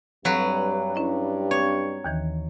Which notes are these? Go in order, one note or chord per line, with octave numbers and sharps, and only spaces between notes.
G2 F#3 G3 C4 A4 B4 F5
C#4 E4 D#5
C4 D4 B4 C#5
D#2 D#3 E3